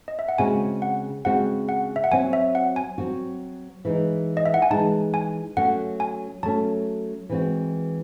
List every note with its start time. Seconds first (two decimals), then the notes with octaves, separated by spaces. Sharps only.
0.08 D#5
0.19 E5
0.29 F#5
0.38 C#3 G#3 C4 F#4 G#5
0.82 F#5
1.25 C#3 G#3 C4 F#4 F#5
1.69 F#5
1.96 E5
2.04 F#5
2.11 F#3 C4 F#4 G#5
2.33 E5
2.55 F#5
2.76 G#5
2.98 F#3 C4 F#4
3.85 E3 G#3 D#4
4.37 D#5
4.46 E5
4.54 F#5
4.62 G#5
4.70 E3 G#3 D#4 A5
5.14 G#5
5.57 F#3 A3 C#4 F#5
6.00 G#5
6.43 F#3 A3 C#4 A5
7.29 E3 G#3 C4 F#4